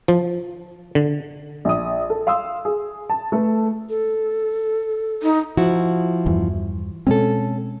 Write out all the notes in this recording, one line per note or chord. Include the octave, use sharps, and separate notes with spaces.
F3
D3
A#1 D#6
A4
F5 C6 D#6 E6
G#4
A5
A3 A4 B4
A4
D#4
F3 E4 F#4
E2 G2 E3
B2 G#3 C4 C#4 A4